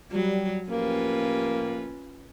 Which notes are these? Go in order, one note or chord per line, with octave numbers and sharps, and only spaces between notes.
F#3 G3
A2 F3 A#3 C#4 F4 G4 B4